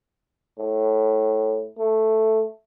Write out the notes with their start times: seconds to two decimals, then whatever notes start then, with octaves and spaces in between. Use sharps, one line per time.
0.59 A2
1.78 A3